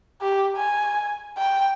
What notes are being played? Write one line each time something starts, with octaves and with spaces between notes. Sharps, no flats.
G4
G#5
G5